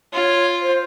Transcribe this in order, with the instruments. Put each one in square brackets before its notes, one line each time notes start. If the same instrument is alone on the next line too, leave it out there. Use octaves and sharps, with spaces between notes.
[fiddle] F4 [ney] C#5
[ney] C5